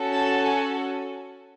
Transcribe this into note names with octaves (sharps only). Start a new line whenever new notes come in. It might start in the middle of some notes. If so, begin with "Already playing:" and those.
Already playing: C#4 F#4 A4
A5
G#5